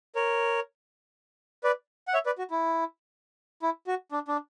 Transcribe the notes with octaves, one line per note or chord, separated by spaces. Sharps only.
A#4 C#5
B4 D5
F#5
C#5 E5
B4 D5
F#4
E4
E4
F#4
D4
D4